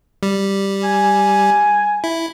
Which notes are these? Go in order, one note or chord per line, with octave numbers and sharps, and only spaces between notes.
G3
G#5
E4